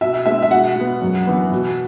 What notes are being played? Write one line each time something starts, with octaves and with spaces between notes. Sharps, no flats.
B2 E5
G#3 B3 E5
E5
B2 F#5
G#3 B3
F#2
E3 B3
B2